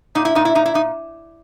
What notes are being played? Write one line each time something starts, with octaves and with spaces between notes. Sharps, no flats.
A#2 D#4
E4
A#2 D#4
E4
A#2 D#4
E4
A#2 D#4